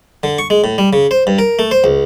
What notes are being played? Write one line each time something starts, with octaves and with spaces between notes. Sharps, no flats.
D3
C#6
G#3
A2
G3
C#3
C5
G2
A#4
A3
C5
C#2